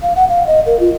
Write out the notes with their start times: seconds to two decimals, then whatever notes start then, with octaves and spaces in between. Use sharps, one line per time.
0.02 F5
0.16 F#5
0.29 F5
0.47 D#5
0.66 A#4
0.80 F4